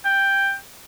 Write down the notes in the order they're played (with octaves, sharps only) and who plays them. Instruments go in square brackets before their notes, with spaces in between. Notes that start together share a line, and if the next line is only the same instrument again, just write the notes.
[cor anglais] G5